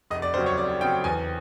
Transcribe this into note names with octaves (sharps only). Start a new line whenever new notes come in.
F1 D#5
D5
D#2 C#3 F#3 C5
C#5
F1 D5
D#2 C#3 F#3 G5
E2 G#5